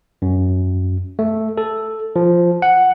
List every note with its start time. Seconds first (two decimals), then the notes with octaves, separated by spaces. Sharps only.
0.22 F#2
1.19 A3
1.57 A4
2.16 F3
2.62 F#5